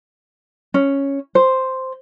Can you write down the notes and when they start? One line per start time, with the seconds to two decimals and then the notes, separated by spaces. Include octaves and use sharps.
0.74 C#4
1.35 C5